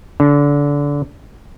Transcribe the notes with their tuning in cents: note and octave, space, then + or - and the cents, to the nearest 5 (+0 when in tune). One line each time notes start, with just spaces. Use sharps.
D3 -25